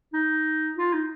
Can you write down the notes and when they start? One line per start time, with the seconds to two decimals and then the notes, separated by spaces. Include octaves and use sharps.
0.14 D#4
0.77 F4
0.94 D#4